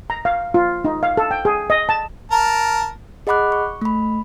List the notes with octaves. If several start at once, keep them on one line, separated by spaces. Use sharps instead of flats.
A#5
F5
F4
D#4
F5
A4
G5
G#4
D#5
A5
A#4 A5
G#4 D#5 F#5 B5 D6 F#6
C#6
A3 B5